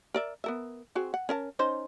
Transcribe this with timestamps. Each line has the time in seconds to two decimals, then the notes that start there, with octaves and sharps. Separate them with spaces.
0.14 A#4 D5 E5
0.44 B3 A#4 E5
0.95 C4 F#4 G#4
1.14 F#5
1.29 C#4 A#4 A5
1.59 C#4 D#4 C5